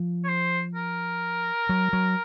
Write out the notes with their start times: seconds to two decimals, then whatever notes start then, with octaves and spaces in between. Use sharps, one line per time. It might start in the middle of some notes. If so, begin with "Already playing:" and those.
Already playing: F3
0.24 C#5
0.28 C5
0.75 A#4
1.69 F#3
1.93 F#3